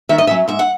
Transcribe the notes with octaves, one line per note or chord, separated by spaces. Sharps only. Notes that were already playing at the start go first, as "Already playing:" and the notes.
D#3 E5
D#5
F#3 C#4 E5
G#2 E5
F#5